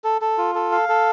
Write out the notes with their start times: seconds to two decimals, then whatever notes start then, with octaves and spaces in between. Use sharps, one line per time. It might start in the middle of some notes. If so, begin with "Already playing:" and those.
0.04 A4
0.21 A4
0.38 F4
0.55 A4
0.72 F5
0.89 A4